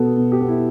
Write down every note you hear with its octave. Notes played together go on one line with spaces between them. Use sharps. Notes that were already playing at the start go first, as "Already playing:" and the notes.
Already playing: B2 B3 A4
B2
G4
B3
E4